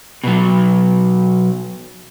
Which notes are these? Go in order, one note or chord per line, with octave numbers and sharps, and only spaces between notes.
B2 F#3